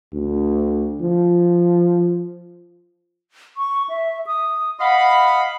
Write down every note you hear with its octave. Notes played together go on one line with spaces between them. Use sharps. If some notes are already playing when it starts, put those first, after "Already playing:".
D2
F3
C#6
E5
D#6
D#5 F5 F#5 B5